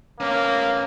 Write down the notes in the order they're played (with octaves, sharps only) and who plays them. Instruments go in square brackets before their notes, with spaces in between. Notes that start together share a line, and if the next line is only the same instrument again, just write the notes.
[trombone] A#3 [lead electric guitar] B3 C#4